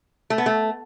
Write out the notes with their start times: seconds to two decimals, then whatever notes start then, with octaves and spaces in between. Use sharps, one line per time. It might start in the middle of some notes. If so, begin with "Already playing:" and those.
0.30 A3
0.38 B3
0.46 A3